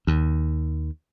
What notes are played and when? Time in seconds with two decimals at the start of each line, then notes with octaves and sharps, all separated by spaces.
0.07 D#2